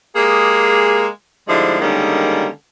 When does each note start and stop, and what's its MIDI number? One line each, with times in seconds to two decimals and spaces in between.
0.16 1.06 56
0.16 1.06 58
0.16 1.06 67
0.16 1.06 68
1.48 1.79 44
1.48 1.79 50
1.48 1.79 53
1.48 1.79 55
1.48 1.79 56
1.48 1.79 64
1.81 2.48 50
1.81 2.48 51
1.81 2.48 55
1.81 2.48 56
1.81 2.48 58
1.81 2.48 61